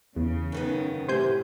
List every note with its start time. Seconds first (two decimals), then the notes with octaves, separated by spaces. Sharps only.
0.16 E2 C#3
0.52 F#2 D#3 B3
1.09 A2 C3 C5 G#5 G6